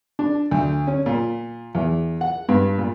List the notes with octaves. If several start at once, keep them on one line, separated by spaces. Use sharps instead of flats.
D4
D2
C#4
A#2
E2
F#5
G2
A#2